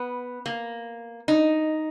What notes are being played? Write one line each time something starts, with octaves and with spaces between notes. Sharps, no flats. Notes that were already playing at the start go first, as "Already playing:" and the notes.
Already playing: B3
A#3
D#4